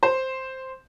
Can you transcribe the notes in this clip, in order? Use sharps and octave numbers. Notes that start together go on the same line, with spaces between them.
C5